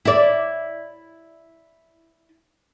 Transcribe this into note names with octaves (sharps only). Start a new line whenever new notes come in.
E4 D5